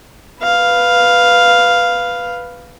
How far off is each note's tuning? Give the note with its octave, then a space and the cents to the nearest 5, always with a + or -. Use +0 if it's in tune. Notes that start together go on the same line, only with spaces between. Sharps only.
B4 +0 F5 +0